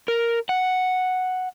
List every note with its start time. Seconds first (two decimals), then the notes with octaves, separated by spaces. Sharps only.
0.08 A#4
0.49 F#5